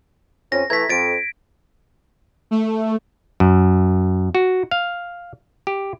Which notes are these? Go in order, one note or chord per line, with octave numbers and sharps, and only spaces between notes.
F2 C#4 A#6
E3 A3 A#5 G#6 B6
F2 A6 D7
A3
F#2
F#4
F5
G4